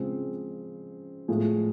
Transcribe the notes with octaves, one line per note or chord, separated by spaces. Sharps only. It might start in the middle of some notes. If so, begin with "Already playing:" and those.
Already playing: C#3 F3 G#3 C4
A2 F3 G#3